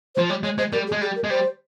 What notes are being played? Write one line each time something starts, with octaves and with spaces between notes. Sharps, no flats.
C5
F3
G3 C#5
G#3 C#5
G#3 C5
G3 A#4
G#4
G#3
G3 G#4
A#4
G#3
G3 C5